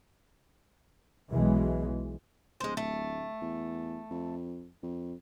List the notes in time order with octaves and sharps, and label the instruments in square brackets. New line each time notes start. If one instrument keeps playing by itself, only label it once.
[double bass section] B1 B2 E3 G#3
[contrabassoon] D1 [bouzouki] G#3 C5
[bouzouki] A3
[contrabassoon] E2
F2
F2